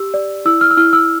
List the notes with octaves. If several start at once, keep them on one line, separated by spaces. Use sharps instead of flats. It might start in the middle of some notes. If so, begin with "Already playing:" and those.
Already playing: G4 E6
D5
E4 E6
F6
E6
E4 F6
E6